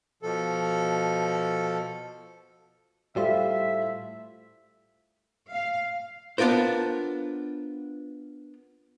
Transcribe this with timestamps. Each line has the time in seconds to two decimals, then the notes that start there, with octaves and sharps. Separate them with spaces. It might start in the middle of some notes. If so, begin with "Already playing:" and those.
0.23 B2 F3 A4
3.16 A2 G3 F4 A4 C5 E5 F5
5.51 F5
6.38 B3 D4 F4 A#4 C5